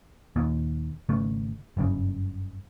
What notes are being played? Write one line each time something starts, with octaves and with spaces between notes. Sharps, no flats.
D#2 A#2
G#1 C#3 A3
F#1 G2 C#3